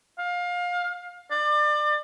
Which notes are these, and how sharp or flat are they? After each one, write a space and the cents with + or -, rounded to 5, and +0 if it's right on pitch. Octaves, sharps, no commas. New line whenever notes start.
F5 +25
D5 +30